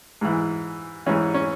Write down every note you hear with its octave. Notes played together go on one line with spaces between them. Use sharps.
G#2 E3
G#2 E3 C#4
C#4